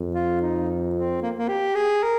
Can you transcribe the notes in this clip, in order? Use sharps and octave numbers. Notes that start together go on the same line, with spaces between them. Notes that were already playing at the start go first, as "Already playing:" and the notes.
Already playing: F2
F4
D#4
C4
A#3
A#3
G4
G#4
A#4